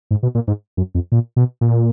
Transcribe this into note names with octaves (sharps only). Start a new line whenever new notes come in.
G#2
B2
A#2
G#2
F#2
F2
A#2
B2
A#2